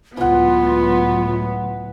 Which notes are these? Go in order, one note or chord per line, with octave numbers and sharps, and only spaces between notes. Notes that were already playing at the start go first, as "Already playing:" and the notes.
C#2 A2 E3 F#3 B3 F4 F#5